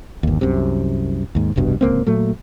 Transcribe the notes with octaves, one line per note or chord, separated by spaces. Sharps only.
G1 D#2
C2 F#2 C3
D#2 G#2
F1 C2 G2 B2
D1 C#2 A#3 C4
A#2 F#3 A3